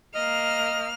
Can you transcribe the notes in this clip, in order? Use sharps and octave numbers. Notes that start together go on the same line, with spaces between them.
A#3 D#5 F6